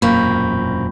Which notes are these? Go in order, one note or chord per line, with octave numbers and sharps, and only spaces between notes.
E1 F#2 A#2 A#3 C4 B5 C#6 G6